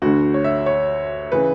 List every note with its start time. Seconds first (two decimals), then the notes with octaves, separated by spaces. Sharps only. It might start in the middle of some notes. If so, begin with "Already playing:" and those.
0.02 D2 D3 F#4
0.34 C#5
0.44 E5
0.66 C#5
1.32 C#3 E3 B4